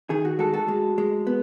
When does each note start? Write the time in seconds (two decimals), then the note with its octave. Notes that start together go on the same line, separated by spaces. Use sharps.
0.10 D#3 G#4
0.25 F#4
0.39 G#3 F#4 A4
0.53 F#4 A4
0.68 G#3
0.98 G#3
1.27 B3